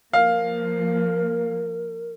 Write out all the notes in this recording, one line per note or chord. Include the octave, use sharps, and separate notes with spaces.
F3 A#3 A#4 F5